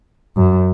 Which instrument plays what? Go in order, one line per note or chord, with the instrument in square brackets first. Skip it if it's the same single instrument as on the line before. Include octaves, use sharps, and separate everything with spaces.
[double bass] F#2